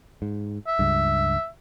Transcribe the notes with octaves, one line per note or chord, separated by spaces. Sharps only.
G#2
E5
C#2 G2